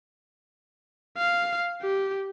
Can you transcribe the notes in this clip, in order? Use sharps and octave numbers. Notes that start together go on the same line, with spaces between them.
F5
G4